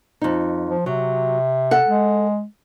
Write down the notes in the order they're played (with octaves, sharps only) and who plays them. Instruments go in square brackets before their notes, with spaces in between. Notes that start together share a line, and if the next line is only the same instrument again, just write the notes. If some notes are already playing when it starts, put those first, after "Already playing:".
[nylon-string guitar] F2 D#4
[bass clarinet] F3
[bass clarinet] C3 [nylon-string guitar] F#3
[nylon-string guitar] A4 F#5
[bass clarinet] G#3